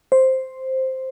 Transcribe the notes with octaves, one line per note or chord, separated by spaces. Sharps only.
C5